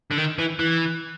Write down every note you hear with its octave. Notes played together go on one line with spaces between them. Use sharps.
D3
D#3
E3
E3